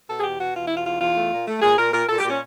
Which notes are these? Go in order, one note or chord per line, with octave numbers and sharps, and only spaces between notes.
B2 A4
G#4
E2 G4
B2 F#4
E2 F4
B2 E4
F4
E2 F4
E2 F4
A3
A#2
A3
A#2 G#4
A#2 A#4
A#2 A#4
A#2 A4
G4
A#2
C#4